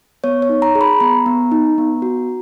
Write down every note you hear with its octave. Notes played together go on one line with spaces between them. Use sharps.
B3 C#5
C#5
D#4
A#5
G#4
B5
B3 A#5
B3
D#4
B3
F#4